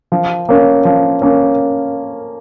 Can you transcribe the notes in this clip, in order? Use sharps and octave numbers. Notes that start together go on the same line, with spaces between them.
F3
A#3 C#4
F3
A#3 C#4